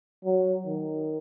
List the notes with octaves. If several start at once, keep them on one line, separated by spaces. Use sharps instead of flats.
F#3
D#3